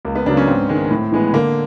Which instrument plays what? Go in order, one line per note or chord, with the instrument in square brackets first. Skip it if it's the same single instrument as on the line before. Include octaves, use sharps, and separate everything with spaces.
[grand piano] C#2 [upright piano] A#3
[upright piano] B3
[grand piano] C#3 F#3 A#3 [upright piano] D4
[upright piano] C#4
[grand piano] G#2 [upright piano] C4
[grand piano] D#3 G#3
A2
E3 G#3 B3
[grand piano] D3 [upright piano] A#3